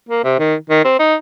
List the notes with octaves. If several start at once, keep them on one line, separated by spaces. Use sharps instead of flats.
A#3
C3
D#3
D#3
C4
D#4